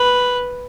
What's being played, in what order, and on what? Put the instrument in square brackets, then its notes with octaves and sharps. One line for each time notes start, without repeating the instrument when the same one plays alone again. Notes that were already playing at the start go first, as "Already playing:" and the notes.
Already playing: [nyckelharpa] B4